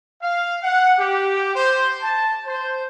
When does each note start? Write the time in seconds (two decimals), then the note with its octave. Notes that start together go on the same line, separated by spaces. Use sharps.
0.22 F5
0.63 F#5
0.98 G4
1.55 C5
2.02 A5
2.46 C5